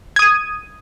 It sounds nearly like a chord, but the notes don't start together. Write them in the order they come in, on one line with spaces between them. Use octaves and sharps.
G#6 D#6 D#7